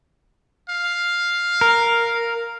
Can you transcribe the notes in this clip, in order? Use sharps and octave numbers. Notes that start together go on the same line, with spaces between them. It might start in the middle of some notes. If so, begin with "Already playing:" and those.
F5
A#4